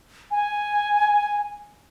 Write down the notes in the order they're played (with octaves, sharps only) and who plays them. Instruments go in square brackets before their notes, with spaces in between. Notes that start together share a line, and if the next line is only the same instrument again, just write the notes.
[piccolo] G#5